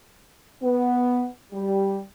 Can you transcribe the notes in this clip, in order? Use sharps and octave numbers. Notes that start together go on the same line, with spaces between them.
B3
G3